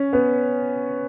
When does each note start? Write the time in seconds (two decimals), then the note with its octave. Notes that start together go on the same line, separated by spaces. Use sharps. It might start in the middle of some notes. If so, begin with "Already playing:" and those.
Already playing: C#4
0.13 B3